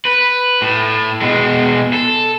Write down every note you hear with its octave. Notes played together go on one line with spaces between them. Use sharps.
B4
A2
B2 G#3
A4